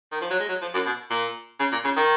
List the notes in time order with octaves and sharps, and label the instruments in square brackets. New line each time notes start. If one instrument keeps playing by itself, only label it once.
[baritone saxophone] D#3
F3
F#3
G#3
F#3
F3
F#2
B2
A#2
C#3
A#2
C#3
D#3